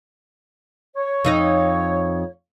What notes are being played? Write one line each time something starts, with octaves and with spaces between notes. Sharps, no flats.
C#5
F2 D#4 D#5